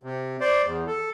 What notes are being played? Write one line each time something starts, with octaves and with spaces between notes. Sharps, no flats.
C3
C5 D5
E2
A4